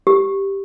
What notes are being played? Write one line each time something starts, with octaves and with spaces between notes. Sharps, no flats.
G4